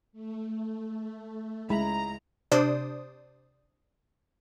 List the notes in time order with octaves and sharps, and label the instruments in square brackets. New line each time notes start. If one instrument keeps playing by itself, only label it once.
[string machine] A3
[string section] C#2 A#5 [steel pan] G#3 E4 B5
[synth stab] C3 D4 C5 D5 D#6